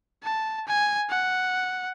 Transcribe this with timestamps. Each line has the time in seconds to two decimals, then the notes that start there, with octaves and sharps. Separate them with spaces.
0.23 A5
0.67 G#5
1.10 F#5